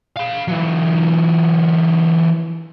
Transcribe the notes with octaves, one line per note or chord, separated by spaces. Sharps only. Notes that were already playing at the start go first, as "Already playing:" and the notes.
F5 B5
E3 F#3